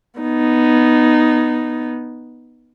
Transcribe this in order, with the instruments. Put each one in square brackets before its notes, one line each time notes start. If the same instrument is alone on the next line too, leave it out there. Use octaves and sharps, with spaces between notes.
[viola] B3 D#4